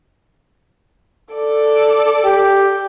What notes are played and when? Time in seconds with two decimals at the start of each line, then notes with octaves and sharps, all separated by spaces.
1.33 A4 D5
2.25 G4